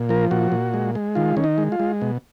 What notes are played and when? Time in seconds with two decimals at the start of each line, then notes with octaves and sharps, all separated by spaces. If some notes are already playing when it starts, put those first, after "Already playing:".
Already playing: A#2
0.09 F3 A#4
0.31 A#2 F#4
0.52 A#2
0.74 G#3
0.95 G#3
1.15 D#3 F4
1.37 D#3 C#4
1.44 D#4
1.58 G#3
1.72 F4
1.80 G#3
2.02 B2